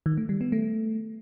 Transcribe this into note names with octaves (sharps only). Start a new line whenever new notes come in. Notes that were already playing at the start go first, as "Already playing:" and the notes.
D#3
A3
G3
B3
A3